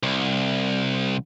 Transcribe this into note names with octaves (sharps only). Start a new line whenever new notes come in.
C2